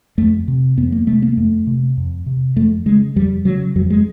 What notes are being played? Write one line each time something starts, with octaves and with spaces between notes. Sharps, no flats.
F2 A3
C3
F2 B3
A#3
C3 A3
A#3
F2 A3
C3
F2
C3
F2 A3
C#3 G#3
F2 G3
C#3 F#3
F2 F#3
G#3